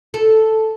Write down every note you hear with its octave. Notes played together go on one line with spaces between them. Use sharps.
A4